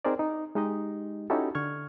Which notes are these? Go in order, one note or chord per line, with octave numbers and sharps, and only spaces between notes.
C4 D#4 G#4 A#4 C5 D5
D#4
G#3 D#4 G4 D#5
C#4 D#4 E4 F#4 G4 A4
D3 C#6 F6 G#6